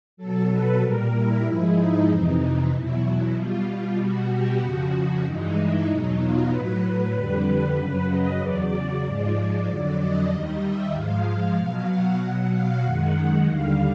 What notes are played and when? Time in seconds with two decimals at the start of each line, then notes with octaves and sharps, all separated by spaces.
0.17 B2 F#3 A4
0.50 B4
0.81 A#2 G3 A#4
1.12 E4
1.44 G#2 F3 G#3
1.76 D#4
2.08 F2 C3 E3
2.39 D#4
2.70 E2 B2 F#3 E4
3.03 E4
3.34 B2 G3 F4
3.97 B2 G3 F#4
4.29 G4
4.60 F2 C#3 F3 F#4
5.24 G2 E3 G#3 D#4
5.55 E4
5.87 E2 B2 F#3 D#4
6.18 F4
6.50 A2 F#3 B4
6.82 B4
7.13 F2 D3 G3 B4
7.77 F#2 C#3 F#3
8.08 D#5
8.40 E2 C#3 F#3 D5
9.03 G#2 F3 G#3 D5
9.67 F2 D3 F#3
9.98 D#5
10.29 D#2 D#3 G3 D#5
10.61 E5
10.92 G#2 F3 G#3 F5
11.56 B2 F#3
11.88 F#5
12.19 B2 F#3
12.51 F5
12.83 F#2 D#3 G#3 F#5
13.46 D#2 D3 G3 F5